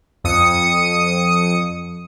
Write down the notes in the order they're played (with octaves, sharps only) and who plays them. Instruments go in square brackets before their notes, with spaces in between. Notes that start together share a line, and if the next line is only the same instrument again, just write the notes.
[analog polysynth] F2 D#6 C#7